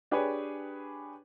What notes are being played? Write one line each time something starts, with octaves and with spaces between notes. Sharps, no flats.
D4 G4 G#4 B4 C#5